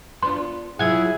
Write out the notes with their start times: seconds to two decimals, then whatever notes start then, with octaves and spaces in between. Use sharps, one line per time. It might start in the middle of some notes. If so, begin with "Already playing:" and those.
0.23 B3 D4 F4 C6
0.79 C3 F#3 E4 F4 G#4 F#5 G#6